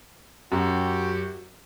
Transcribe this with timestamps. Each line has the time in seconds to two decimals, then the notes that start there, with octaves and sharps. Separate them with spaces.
0.52 F#2 F#4 G4